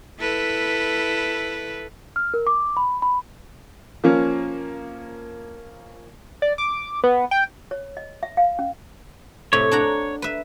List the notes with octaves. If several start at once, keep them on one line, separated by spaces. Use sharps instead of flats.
E4 A4 B4
F6
A#4
D6
B5
B5
F3 A#3 C#4
D5
D6
B3
G5
C#5
D#5
E5
F5
C#4
A2 C3 C#5
D4 F#5 A#5
B4 E5